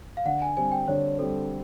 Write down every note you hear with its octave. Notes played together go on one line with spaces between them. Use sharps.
F5
D3 F#5
G#5
G3 C4 G#5
G5
D3 C#5
G3 C4 A4